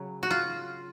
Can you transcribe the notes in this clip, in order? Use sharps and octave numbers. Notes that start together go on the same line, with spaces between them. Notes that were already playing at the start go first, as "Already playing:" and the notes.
Already playing: C#3 F#3
F#4
F4